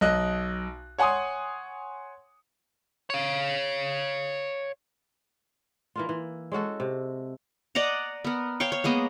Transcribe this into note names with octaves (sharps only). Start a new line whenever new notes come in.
B1 D#5 F#6
C#5 F#5 G#5 C6 D#6
C#5 F5
E3 A#3 F4
E3
G#3 C#4 F#4 A4
C3
D5 D#5 F#5 A#5
B3 A#4
C#5 F5 G5 C#6
C#5
G#3 A#3 B3 D#5